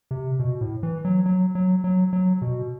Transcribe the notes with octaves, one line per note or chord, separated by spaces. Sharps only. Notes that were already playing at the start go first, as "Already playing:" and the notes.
C3
B2
A2
E3
F#3
F#3
F#3
F#3
F#3
B2